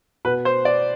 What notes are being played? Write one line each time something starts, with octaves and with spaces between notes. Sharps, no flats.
B2 B4
C5
D5